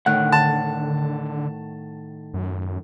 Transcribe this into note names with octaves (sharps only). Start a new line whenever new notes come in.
A2 D3 D#3 F#5 F#6
A5
F#2